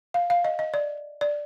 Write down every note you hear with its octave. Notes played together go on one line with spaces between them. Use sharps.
F5
F5
D#5
D#5
D5
D5